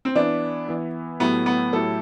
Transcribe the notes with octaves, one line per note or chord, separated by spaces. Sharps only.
C4
E3 B3 D4 E4
E3 B3 E4
A2 F#3 A3 B3 E4 G4
B3
A2 F#3 A3 E4 G4 A4